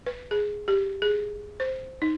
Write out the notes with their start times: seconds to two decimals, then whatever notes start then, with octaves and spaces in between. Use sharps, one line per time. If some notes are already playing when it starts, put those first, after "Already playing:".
0.06 B4
0.31 G#4
0.68 G4
1.02 G#4
1.60 C5
2.02 D#4